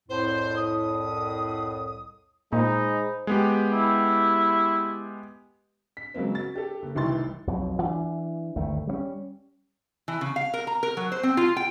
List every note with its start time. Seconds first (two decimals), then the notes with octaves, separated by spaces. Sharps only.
0.09 C2 F2 A2 C5
0.56 D#6
2.53 A#2 G#3 D#4 C5 B5
3.27 G#3 B3 G4
3.72 E4
5.97 B6
6.14 C#3 F#3 G#3 A#3 C4
6.35 F#4 A6
6.55 G4 A4
6.83 F#1
6.95 F1 C2 D#3 E3 C6 A6
7.47 B1 F2 B2 F#3
7.82 E3 D4
8.56 G1 D2 D#3 A3
8.87 G3 A3 C#4
10.08 E3
10.21 C#3
10.36 F5
10.54 A#4
10.67 A#5
10.83 A#4
10.97 F#3
11.12 C5
11.23 C4
11.37 F4
11.57 G5